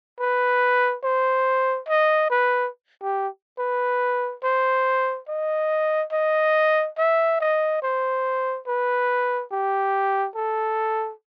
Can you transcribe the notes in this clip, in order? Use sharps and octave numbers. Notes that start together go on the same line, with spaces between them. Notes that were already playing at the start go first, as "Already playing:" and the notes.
B4
C5
D#5
B4
G4
B4
C5
D#5
D#5
E5
D#5
C5
B4
G4
A4